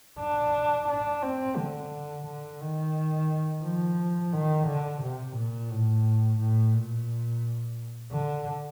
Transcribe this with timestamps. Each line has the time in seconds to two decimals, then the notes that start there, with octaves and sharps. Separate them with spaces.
0.19 D4
0.88 D4
1.22 C4
1.57 D3
2.26 D3
2.61 D#3
3.64 F3
4.33 D#3
4.67 D3
5.02 C3
5.36 A#2
5.71 A2
6.40 A2
6.74 A#2
8.12 D3